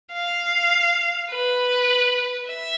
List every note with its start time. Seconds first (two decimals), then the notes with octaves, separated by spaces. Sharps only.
0.12 F5
1.30 B4
2.47 E5